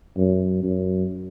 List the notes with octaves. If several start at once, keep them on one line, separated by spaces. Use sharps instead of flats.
F#2
F#2